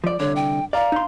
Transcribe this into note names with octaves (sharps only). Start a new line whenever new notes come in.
F3 D5
C2 F2 D3 C#5
G5
D5 F5 A#5
D#4 C6